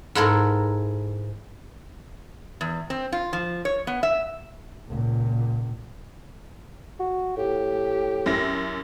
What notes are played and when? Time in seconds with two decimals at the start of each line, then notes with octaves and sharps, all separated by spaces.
0.15 G#2 E4 A4 A#4
2.61 E2
2.90 C4
3.12 F4
3.33 F3
3.65 C#5
3.87 B3
4.03 E5
4.88 C#2 A#2
7.00 F#4
7.37 A2 G4
8.26 F#2 E4 A#6